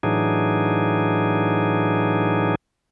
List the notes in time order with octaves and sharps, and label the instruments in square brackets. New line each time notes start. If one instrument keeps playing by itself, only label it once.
[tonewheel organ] A2 E3 F#3 D4 D#4 G#4